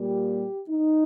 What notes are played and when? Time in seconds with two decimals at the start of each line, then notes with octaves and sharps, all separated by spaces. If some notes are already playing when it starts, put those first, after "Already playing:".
Already playing: A#2 G3 A#3 G4
0.69 D#4